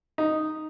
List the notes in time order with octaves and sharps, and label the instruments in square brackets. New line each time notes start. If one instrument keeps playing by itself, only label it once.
[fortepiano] D#4